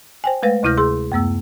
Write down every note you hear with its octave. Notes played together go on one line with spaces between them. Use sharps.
C5 G5 G#5
G#3 A3 B4 F5 A#6
D2 C3 E4 F6 G6 A#6
G#4 C6 E6
F#2 A3 B3 E6